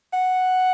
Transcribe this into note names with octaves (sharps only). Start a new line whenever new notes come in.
F#5